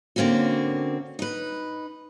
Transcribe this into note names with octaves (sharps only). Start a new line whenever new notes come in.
D3 A#3 C4 C#4 F#4
D#4 B4